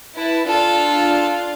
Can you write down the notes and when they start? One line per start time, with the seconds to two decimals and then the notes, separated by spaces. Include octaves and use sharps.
0.16 E4 B4 A5
0.48 D4 F4 A4 F5